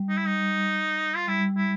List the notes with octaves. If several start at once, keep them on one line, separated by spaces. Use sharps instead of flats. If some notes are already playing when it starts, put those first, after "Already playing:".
Already playing: G3
D#4
E4
D#4
F4
G3 E4
E4